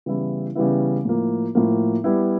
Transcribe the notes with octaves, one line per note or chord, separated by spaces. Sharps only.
C#3 E3 G3 B3 E4
C#3 E3 G3 B3 E4
A2 F3 A#3
A2 F3 A#3
G3 B3 E4